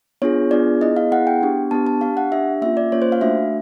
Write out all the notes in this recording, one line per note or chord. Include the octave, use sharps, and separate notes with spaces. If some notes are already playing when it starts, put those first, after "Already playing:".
B3 D4 F4 G#4 C#5
B3 D4 F4 G#4 D5
B3 E4 G#4 D#5
F5
B3 E4 G#4 F#5
G5
B3 D4 G4
B3 D4 G4 A5
A5
D4 G4 F5
F#5
D4 G4 E5
A#3 C#4 F4 E5
D5
A#3 C#4 F4 C#5
C5
F5
A3 D4 F#4 E5